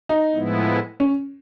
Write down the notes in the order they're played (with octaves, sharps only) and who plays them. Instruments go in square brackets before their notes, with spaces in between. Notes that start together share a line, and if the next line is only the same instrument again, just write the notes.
[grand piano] D#4
[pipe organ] A2 F3 G#3 B3 E4
[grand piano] C#4